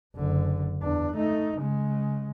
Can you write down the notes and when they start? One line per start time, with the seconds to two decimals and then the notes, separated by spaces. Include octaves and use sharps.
0.16 F#1 D3
0.82 E2 D4
1.15 A3 D#4
1.59 C#3 G#3